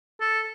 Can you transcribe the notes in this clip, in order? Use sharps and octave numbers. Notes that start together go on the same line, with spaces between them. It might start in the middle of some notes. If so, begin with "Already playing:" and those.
A4